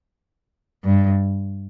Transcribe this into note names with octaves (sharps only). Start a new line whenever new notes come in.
G2